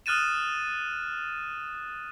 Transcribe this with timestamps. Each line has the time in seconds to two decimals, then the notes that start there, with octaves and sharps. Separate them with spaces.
0.06 D#6 F6 F#6 A6 D#7 E7